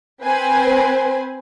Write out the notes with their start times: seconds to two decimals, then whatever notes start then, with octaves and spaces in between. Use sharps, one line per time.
0.23 C4 B4 C5 G#5